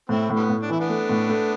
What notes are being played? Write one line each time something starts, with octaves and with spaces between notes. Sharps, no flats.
A2 C4 E4
A2
D3 G3 B3
A2
D4
E3 E4
B3 D4
A3
A2
A3